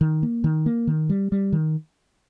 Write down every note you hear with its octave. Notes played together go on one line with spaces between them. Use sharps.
D#3
A#3
D#3
A#3
D#3
G3
G3
D#3